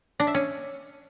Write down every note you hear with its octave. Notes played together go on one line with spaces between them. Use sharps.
D4
E5
C#4